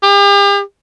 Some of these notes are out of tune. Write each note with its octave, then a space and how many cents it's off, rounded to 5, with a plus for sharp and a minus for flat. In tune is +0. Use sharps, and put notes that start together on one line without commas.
G4 +40